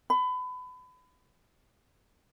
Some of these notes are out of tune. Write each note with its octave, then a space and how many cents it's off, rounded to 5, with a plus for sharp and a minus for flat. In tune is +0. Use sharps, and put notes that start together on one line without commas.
B5 +30